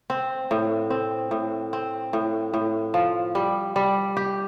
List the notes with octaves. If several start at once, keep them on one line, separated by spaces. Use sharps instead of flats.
C4
A2
C4
A2
C4
A2
A2
F3
G3
G3
G4